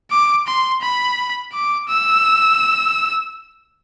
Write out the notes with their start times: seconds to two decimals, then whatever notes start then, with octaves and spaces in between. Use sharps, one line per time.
0.11 D6
0.47 C6
0.82 B5
1.53 D6
1.88 E6